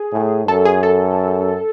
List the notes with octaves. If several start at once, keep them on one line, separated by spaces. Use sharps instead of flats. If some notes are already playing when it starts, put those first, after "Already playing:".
Already playing: G#4
A2
F#2 A4
G#4
A4